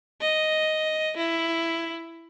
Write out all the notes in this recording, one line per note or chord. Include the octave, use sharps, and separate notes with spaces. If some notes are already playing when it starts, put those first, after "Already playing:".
D#5
E4